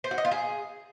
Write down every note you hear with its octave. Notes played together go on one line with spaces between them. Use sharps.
C5
F#4
D#5
F4
G#4